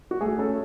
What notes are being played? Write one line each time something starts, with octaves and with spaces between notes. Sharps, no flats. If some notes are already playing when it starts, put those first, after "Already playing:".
F#4
A3 G#4
C#4 A4